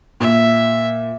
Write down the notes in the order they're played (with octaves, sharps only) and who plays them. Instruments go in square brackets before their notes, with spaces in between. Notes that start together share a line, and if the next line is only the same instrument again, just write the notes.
[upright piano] A#2 [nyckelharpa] E5